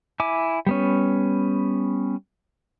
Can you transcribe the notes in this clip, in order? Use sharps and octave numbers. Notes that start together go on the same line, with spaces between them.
E4 G#5 D6
G3 B3 C#4